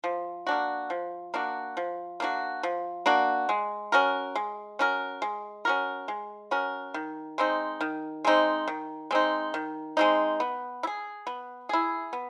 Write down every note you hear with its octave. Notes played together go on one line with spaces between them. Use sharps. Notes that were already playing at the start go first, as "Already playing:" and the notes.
F3
A#3 D4 F#4
F3
A#3 D4 F#4
F3
A#3 D4 F#4
F3
A#3 D4 F#4
G#3
C#4 F#4 A#4
G#3
C#4 F#4 A#4
G#3
C#4 F#4 A#4
G#3
C#4 F#4 A#4
D#3
G#3 C4 D#4
D#3
G#3 C4 D#4
D#3
G#3 C4 D#4
D#3
G#3 C4 D#4
B3
E4
G#4
B3
E4 G#4
B3